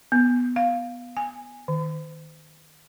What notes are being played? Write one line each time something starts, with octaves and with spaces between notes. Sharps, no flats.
B3
F5
G#5
D#3